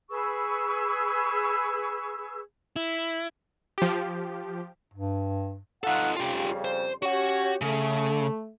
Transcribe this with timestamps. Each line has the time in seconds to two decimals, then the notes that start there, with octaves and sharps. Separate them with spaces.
0.10 G#4 B4 C#6 E6
2.76 E4
3.78 F3 G4
4.94 G2
5.84 D#4 F4 A4 F#5
6.17 F2 C#3 G3 F4 G4
6.65 C5
7.03 C#4 F#4 G4 C#5 F#5
7.62 C#3 A3